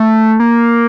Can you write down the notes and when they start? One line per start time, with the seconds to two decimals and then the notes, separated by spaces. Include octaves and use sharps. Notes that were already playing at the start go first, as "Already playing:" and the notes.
Already playing: A3
0.40 A#3